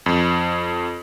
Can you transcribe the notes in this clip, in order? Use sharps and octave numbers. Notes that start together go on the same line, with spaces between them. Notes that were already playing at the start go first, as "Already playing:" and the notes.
F2